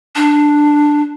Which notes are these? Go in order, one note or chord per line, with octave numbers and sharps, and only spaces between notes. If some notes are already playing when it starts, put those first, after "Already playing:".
D4